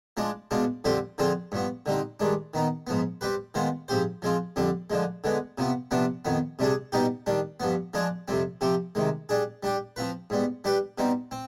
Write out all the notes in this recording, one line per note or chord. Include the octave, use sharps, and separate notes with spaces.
F3 G#3 D4
B2 G#3 D4 F4
F2 D3 G3 C4 G4
D3 F3 C4 F4 G#4
G2 F3 B3
D3 G3 C4 D#4
G2 D#3 G#3 D4
D#3 B3 D#4
G#2 F3 B3
G3 C4 G4 B4
D#3 G#3 B3 F4 C5
G#2 F3 C4 G4 C5
F3 G#3 C4 F4
F2 D3 G3 D4
D3 F3 G#3
D3 G#3 B3
C3 F3 B3
C3 F3 B3 D4
F2 D#3 B3
C3 G3 D4 G#4
B2 G3 B3 D#4 G4
D#3 G3 D4
G2 F3 B3
F3 G#3 D4 G#4
F2 C3 G3 C4
C3 F3 C4 G4
C3 D#3 G#3
G3 D4 G#4
G3 D4 G4
F3 C4 F4 B4
G#2 G3 B3
G3 D4 G4 B4
B2 G3 C4 D#4
C4